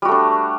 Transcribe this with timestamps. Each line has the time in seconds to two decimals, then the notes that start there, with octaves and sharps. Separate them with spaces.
0.02 G3
0.05 F#4
0.08 A3
0.11 D4